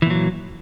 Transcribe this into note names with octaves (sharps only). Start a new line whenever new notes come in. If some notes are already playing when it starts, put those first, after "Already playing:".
A#2 E3 F#3